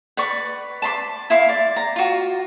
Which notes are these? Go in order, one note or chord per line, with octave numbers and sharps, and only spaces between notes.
B4 D5 C#6
A5 B5 C6 D6
E4 E5 F5 C6
D5
A#5
F4 F#4